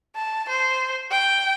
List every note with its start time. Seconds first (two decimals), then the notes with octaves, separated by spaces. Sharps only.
0.16 A5
0.49 C5
1.11 G5